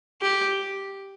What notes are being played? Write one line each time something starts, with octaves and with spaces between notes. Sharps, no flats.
G4